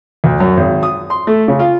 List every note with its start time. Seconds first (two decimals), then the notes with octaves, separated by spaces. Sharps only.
0.24 D2
0.40 F#2
0.57 G#1
0.83 D#6
1.10 C6
1.27 A3
1.48 C#3
1.59 F4